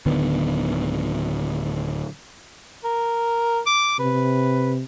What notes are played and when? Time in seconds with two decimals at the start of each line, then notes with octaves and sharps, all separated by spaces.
0.06 D1 D3 D#3 B3
2.84 A#4
3.67 D6
3.99 C3 B4